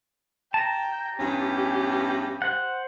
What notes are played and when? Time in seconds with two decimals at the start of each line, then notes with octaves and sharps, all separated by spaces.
0.54 G5 A5 A#5
1.18 E2 G2 C#4 G4
2.42 C5 F#5